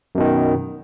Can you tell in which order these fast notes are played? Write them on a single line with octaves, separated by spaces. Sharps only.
F#2 B2 D#3